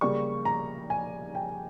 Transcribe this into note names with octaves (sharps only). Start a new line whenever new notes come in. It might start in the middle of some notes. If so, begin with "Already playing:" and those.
C#3 G3 A#3 C#6
A#5
G#5
G5